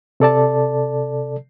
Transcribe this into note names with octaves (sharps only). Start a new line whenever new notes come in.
C3 A4 D5 A5